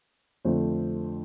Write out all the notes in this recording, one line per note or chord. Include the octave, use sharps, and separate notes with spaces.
F2 D3 A3 C5